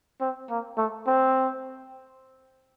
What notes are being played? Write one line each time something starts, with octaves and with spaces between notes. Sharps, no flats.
C4
A#3
A3
C4